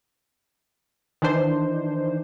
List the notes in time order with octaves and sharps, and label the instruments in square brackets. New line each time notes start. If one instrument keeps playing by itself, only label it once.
[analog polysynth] D#3 E3 D4 C5